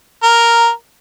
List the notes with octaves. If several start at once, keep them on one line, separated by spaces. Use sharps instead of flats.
A#4